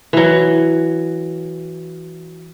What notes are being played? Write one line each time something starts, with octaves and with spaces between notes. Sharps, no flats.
E3 F#3